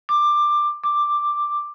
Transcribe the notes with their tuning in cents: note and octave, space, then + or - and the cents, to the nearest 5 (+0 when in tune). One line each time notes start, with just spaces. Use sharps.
D6 +15
D6 +5